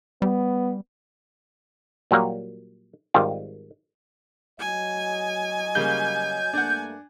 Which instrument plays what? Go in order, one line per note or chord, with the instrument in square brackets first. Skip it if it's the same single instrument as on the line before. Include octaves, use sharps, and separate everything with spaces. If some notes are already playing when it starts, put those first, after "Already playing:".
[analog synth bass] G3 [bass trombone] B3
[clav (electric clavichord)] A#2 F#3 G3 A#3
G#1 D#3 G3 F4
[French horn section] F#3 D#5 [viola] G#5
[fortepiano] C#3 G3 A#3 [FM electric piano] G6
[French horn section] G2 A3 A#3 [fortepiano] D4 F#5